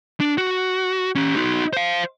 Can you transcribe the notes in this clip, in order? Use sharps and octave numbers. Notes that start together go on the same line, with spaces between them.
D4
F#4
C#4 G4
D#4 F#4
C5 F5